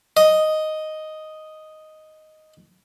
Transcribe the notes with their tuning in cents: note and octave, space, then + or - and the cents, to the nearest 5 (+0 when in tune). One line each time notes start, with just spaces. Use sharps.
D#5 +0